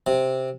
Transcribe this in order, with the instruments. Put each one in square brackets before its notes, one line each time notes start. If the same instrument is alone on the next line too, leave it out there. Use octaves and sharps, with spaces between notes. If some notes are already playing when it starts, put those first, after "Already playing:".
[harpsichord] C3